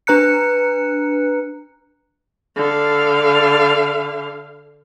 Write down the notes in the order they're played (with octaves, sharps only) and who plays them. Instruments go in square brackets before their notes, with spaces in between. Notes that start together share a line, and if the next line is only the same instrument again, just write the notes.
[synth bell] D4 B4 A#5 F#6 C#7
[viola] D3 F5